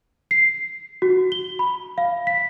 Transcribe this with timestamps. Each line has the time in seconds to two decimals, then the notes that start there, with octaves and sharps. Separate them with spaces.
0.31 C7
1.02 F#4
1.32 G7
1.59 B5
1.98 F5
2.27 B6